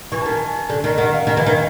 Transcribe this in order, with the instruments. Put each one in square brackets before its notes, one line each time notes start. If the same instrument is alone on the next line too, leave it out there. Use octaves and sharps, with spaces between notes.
[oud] E3 [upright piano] C#6
[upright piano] A5
[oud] D#3 [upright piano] G#5
[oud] D3
D#3
[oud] D#3 [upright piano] F#5
[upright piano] F5
[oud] D#3
E3
D#3